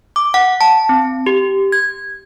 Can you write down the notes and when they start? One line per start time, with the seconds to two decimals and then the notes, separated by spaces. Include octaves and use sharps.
0.16 D6
0.34 F#5
0.61 A5
0.89 C4
1.26 G4
1.72 G#6